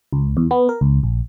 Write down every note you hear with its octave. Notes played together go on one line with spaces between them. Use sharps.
C#2
E2
B3
A#4
C#2
A#1